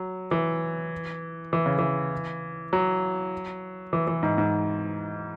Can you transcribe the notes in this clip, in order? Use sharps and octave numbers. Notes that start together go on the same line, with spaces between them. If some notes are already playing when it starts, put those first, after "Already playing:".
Already playing: F#3
E3
E3
C#3
E3
F#3
E3
E3
G#2
G#2